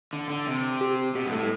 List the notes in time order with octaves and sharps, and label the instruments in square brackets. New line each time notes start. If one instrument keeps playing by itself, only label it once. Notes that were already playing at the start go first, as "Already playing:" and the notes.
[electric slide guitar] D3
D3
C3
[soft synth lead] G4
[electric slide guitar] B2 [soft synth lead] G4
[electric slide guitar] G2
[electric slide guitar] A2 [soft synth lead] A4